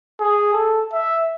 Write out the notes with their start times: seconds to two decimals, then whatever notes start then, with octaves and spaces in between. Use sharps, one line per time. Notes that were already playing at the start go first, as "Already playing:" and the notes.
0.20 G#4
0.53 A4
0.93 E5